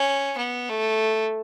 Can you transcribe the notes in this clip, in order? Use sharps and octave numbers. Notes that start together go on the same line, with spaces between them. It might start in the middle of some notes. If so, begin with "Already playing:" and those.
Already playing: C#4
B3
A3